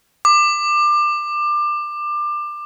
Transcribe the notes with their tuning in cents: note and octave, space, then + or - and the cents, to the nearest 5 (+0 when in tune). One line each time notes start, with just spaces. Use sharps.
D6 +25